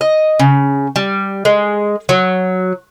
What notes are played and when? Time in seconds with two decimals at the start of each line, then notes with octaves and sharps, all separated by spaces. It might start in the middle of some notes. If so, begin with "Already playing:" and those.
0.01 D#5
0.39 C#3
0.96 G3
1.45 G#3
2.09 F#3